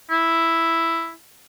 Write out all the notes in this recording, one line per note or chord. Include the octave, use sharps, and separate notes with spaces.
E4